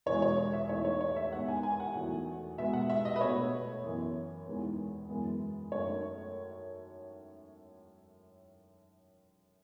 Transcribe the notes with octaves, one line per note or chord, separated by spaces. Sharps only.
E2 B2 G#3 C#5
C#5
E5
E2 D#3 A3 C#5
C#5
C#5
E5
D#2 D#3 G#3 B3 F#5
G#5
G#5
F#5
E2 D#3 F#3 A3
B2 G#3 B3 E5
F#5
E5
D#5
B4
B2 A3 C#5
F#2 E3 B3
E2 D#3 G#3 B3
F#2 E3 G#3 B3
F#2 D#3 A3 C#5